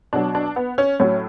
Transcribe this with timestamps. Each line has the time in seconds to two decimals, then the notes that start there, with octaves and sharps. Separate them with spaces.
0.13 B2 F#3 D4
0.35 D4
0.56 B3
0.78 C#4
1.00 A2 F#3 C#4